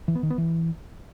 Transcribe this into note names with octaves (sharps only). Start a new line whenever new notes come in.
E3
B3
D#3
B3
E3